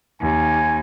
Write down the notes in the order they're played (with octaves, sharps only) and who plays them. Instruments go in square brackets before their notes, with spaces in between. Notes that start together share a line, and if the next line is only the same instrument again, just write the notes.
[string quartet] D#2 [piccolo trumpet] G#5